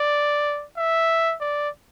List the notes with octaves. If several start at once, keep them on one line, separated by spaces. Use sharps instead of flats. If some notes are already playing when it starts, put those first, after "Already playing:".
Already playing: D5
E5
D5